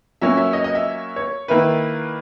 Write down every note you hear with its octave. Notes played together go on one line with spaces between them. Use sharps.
F#3 A#3 C#4 E5
E5
D#5
D#5
E5
C#5
D#3 A#3 E4 B4